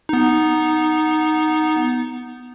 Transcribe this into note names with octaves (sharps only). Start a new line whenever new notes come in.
B3 D#4